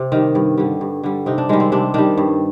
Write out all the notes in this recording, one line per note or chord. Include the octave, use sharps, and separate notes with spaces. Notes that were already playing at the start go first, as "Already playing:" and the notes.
Already playing: C3
D#3 G3
G2
D3 G3
G2
D3 G3
C3 D#4
D4
D#3 G3 G#3
C4
C3 D4
D#3 G3 D4
G2